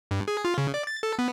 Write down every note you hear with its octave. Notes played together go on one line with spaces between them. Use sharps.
G2
G#4
F4
C#3
D5
A6
A4
B3